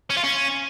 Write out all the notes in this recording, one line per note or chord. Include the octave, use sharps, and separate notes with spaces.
C#4
F4
C#4